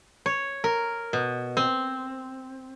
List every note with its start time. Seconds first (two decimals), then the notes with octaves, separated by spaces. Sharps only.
0.26 C#5
0.64 A#4
1.13 B2
1.57 C4